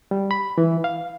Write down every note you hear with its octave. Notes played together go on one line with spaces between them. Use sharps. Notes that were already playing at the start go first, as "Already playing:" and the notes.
G3
B5
E3
F5